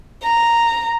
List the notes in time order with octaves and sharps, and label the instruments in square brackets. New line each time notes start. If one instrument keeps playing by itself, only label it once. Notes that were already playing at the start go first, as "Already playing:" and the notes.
[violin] A#5